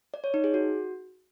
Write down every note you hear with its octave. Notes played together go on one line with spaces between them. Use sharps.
D5
C#5
D#4
G#4
F#4